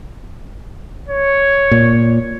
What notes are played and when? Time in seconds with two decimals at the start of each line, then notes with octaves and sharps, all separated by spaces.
1.08 C#5
1.71 A#2